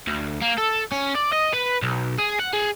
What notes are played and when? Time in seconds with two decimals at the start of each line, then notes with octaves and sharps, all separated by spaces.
0.07 D2
0.42 A#3
0.58 A4
0.92 C#4
1.15 D5
1.32 D#5
1.53 B4
1.82 B1
2.19 G#4
2.39 F#5
2.53 G#4